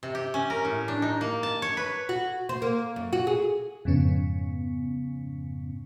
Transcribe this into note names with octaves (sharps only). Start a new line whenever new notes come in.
C3
G4
C#4
A#4
A2
D4
D#4
A#3
A5
C#5
B4
F#4
C5
A#3
F#2
F#4
G#4
F2 G#2 C#3 B3 C#4